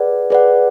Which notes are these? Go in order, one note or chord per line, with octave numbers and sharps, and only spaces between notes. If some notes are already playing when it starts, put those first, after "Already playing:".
Already playing: G#4 B4 D5 F#5
G#4 B4 D5 F#5